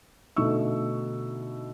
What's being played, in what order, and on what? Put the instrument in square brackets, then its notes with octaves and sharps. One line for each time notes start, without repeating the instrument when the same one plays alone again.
[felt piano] B2 D3 A3 D#4 C#6 E6